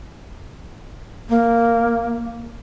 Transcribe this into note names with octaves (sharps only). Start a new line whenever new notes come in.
A#3